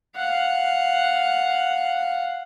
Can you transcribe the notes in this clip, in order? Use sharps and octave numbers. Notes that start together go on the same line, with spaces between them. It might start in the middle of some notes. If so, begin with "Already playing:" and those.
F5 F#5